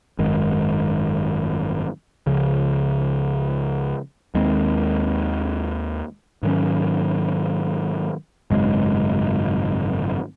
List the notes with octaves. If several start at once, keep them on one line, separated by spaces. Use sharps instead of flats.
G#1 F#2 D#3 G#3
C#2 C#3 F3
D#2 D#3 G#3 C4
G#2 D#3 F#3 C#4
G#1 F#2 C#3 G#3